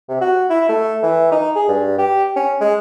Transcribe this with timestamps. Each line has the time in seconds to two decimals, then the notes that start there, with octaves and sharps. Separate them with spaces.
0.09 C3
0.21 F#4
0.50 E4
0.69 A3
1.03 E3
1.32 D#4
1.56 G#4
1.68 G2
1.98 G4
2.36 C#4
2.61 G#3